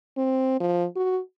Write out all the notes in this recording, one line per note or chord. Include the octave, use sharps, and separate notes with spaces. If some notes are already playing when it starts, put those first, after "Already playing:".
C4
F3
F#4